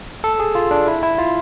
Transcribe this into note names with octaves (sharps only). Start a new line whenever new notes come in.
A4
G#4
F4
D4
E4
E4
F4